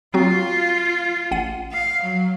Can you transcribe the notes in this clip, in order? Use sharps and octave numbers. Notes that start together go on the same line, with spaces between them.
F#3 C4 F4 F#4
A1 F#5 D#7
F5
F#3